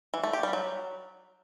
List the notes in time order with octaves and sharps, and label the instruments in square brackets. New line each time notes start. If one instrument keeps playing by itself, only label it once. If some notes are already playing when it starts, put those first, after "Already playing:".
[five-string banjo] E3
A3
G4
G3
F#3